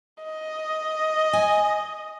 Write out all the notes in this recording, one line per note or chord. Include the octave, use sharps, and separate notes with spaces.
D#5
G#5